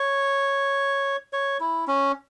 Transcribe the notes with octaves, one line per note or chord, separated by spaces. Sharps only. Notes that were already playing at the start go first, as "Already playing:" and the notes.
Already playing: C#5
C#5
E4
C#4